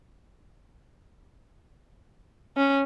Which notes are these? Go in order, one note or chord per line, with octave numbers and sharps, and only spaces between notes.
C#4